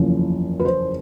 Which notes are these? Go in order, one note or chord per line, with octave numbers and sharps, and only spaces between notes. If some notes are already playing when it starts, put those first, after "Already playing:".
Already playing: F#1 E2 C#3 F3
B4
C5